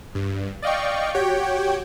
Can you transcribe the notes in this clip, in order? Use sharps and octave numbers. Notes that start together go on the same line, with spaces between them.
G2
D5 D#5 F5 G5 C#6
F#4 G4 C#5 G5